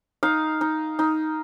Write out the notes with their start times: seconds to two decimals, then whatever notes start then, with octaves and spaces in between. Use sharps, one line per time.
0.23 D#4 F5
0.61 D#4
0.99 D#4